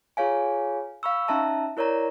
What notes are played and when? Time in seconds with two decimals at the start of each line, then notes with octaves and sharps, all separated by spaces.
0.17 F4 G#4 C#5 F5 G#5
1.03 F5 B5 C#6 E6
1.28 C#4 D#4 E5 A5 A#5
1.77 E4 A#4 C#5 D5 A#5